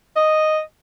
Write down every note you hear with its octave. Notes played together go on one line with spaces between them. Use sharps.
D#5